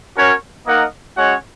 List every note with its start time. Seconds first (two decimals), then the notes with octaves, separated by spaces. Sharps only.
0.15 C#4 F#4 A#4 C#5
0.66 A#3 D#4 A#4 D#5 F#5
1.16 G#3 C#4 F#4 C#5 F#5